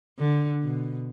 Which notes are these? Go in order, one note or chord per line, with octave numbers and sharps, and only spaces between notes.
D3
B2